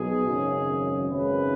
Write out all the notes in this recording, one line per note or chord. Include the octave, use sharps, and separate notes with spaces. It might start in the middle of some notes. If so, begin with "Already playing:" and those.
Already playing: B1 B2 G#4
G#1 F#2 C#3
G#1 F#2 C#3 B4